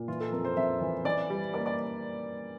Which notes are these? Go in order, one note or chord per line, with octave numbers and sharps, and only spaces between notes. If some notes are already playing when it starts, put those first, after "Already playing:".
Already playing: A#2
E3 F4
A4
F2 A#4
C5
F2 E5
E3
E3 D5
G3
A#3 D5
D5